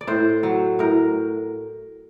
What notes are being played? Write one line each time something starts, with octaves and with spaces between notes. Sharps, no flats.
D5
A2 C5
F#3
A2 A#4